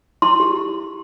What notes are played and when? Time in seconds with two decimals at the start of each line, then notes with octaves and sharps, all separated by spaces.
0.22 E4 C6
0.40 G4